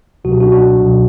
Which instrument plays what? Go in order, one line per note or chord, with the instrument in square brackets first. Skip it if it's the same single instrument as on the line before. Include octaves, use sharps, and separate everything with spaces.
[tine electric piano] C#2 B2 F#3 F#4
G4
D4 F#4
D4 F#4
C#2 B2 F#3